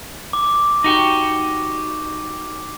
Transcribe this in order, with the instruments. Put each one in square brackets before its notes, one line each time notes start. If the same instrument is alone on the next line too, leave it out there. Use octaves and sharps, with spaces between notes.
[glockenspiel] D6
[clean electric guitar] D#4 F#4 G4